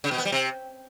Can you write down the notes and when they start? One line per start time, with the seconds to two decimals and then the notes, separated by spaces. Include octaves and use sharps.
0.04 C#3
0.11 B2
0.18 B3
0.25 G3
0.32 C3